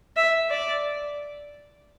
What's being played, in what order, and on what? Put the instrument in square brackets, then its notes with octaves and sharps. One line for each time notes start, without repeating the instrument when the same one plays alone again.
[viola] E5
D5